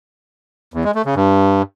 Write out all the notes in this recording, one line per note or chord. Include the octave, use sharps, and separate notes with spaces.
E2
G#3
A3
C#3
G2